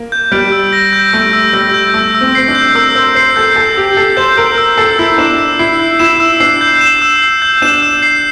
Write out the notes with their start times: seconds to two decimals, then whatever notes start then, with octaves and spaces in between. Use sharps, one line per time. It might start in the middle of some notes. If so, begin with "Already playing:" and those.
Already playing: A#3
0.12 G6
0.32 G3 D7
0.52 E6
0.73 A#6
0.93 G6
1.13 A3 D7
1.33 E6
1.53 G3 A#6
1.74 G6
1.94 A3 E6
2.15 E6
2.21 C4
2.35 C4 C7
2.48 D4
2.55 G6
2.75 A#4 E6
2.95 C5 E6
3.15 C5 C7
3.36 A4 G6
3.56 A4 E6
3.76 G4 E6
3.97 A4 C7
4.17 C5 G6
4.37 A#4 E6
4.58 E6
4.78 A4 C7
4.98 E4 G6
5.18 D4 E7
5.38 E6
5.59 E4 C7
5.80 G6
5.99 E4 E7
6.20 E6
6.40 D4 C7
6.61 G6
6.81 E7
7.02 E6
7.22 C7
7.42 G6
7.62 D4 E7
7.82 E6
8.03 C7